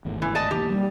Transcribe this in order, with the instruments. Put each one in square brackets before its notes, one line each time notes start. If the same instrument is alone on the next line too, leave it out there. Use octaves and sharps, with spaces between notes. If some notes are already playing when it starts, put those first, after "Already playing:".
[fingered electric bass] G#1 E2 A2
[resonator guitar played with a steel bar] E3
D5 D#5 A5
[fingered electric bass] B1 E3 A#3 [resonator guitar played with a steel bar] G4
[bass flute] G3